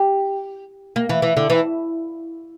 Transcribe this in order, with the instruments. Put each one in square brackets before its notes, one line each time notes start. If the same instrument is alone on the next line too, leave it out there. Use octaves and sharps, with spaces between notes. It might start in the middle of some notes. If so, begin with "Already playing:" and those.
Already playing: [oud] G4
A#3
E3
E3
D3
E3